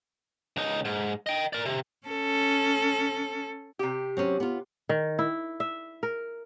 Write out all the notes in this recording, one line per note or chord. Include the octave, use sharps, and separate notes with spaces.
C#2 D#4
G#2
D#5 G5
A#4 D5
C3
C#4 A4
C3 G4
F#3 C4 C#4
B3 F4
D#3
E4
E5
A#4